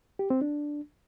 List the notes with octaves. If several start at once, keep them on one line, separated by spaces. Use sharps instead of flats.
G4
C4
D4